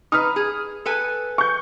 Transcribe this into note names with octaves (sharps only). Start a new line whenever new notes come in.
D#4 B4 D#6 F6
G#4
A4 B4 G#5
C#6 G6